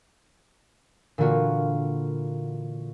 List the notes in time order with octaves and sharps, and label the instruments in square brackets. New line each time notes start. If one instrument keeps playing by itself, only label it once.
[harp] A#2 D3 E3 A#3 F4 F#4